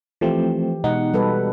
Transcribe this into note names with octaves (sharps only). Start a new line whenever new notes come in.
E3 F3 A3 C4 G4
B2 G#3 D#4 F#5
G3 A4 B4